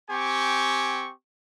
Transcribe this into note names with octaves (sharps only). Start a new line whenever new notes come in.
C4 G4 G#5 C#6